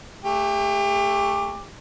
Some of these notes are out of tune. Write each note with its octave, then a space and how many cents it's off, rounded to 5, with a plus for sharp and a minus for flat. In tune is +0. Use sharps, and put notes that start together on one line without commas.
A3 +0 G4 +40 D6 +0